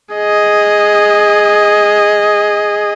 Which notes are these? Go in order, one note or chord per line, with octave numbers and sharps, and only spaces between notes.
G#4 D#5